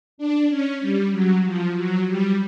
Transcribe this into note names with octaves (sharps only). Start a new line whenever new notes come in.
D4
C#4
G3
F#3
F3
F#3
G3